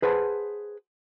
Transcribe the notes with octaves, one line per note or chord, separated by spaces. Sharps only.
G#4 B4 C5 F#5 A5